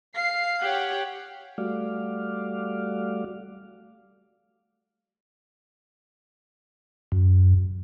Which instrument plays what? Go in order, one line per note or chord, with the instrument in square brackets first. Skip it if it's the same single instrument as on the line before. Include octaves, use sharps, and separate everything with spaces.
[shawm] F5 [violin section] C7
[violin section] G4 C#5 F#5
[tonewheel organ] G3 A3 F#4 D5 F5
F#2